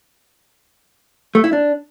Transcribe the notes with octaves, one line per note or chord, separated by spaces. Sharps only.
A3
E4
D4